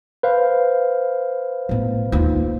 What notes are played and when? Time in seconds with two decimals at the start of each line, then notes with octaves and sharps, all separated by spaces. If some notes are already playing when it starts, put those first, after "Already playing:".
0.23 B4 C5 F5
1.69 A2 B3
2.12 D#2 F4